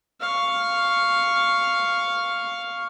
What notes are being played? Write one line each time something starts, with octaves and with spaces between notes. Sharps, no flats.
F5 C#6